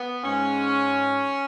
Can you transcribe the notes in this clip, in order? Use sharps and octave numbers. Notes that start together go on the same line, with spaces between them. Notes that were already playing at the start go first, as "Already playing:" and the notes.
Already playing: B3
G#2 G#3 C#4